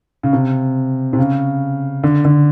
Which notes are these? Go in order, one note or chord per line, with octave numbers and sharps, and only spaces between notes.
C#3
C3
C3
C#3
D3
D3